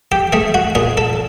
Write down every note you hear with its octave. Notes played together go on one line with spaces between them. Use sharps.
G4
A3 G#4
F#4
A#2 G#4
A4